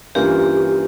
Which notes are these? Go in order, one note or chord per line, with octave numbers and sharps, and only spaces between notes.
G2 E3 A#3 C#4 F4 G4